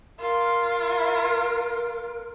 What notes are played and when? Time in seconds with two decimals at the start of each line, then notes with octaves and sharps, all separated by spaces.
0.19 F4 A#4